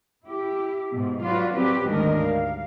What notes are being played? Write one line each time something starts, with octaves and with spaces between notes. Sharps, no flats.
E4 G4
G#2 B2
F#3 F4 F#4 B4 D5
F#3 C4 G4 B4
D2 G#2 D#3 D4 A#4 D#5
G3 F5